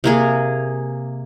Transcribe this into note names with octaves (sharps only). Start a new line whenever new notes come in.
C3 A#3 G#4